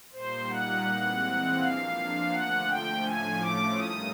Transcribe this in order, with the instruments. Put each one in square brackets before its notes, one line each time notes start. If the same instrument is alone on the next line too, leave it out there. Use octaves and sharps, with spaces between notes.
[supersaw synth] A#2 G3 A#3 D#4 [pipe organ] C5
[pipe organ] F#5
[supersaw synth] E3 G#3 C4
[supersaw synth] F3 A#3 D4 [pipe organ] F5
[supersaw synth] D3 F3 A3 [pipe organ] F#5
[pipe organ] G5
[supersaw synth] A2 F3 A3 C#4 [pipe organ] G#5
[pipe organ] D6
[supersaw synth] A#2 G3 A#3 D#4 [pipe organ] D#6